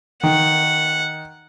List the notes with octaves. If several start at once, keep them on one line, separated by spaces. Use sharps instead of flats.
D#3 F#5